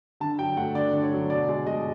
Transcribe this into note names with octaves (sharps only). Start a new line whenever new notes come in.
D3 A5
F#3 G5
A3 F#5
D3 D5
D3
C#5
F#3
B2 D5
G#3
B2 D#5